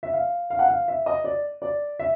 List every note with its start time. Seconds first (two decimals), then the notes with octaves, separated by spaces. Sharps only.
0.03 E5
0.13 F5
0.50 F5
0.59 F#5
0.69 F5
0.88 E5
1.06 D#5
1.24 D5
1.62 D5
1.99 E5